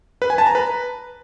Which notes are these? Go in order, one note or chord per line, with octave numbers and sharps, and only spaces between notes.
B4
G#5
A5
A#5
B4